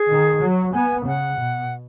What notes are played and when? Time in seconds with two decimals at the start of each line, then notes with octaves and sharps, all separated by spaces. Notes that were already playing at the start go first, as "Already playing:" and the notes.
Already playing: G#4
0.10 D#3
0.42 F#3
0.74 B3 G#5
1.06 C#3 F#5
1.38 B2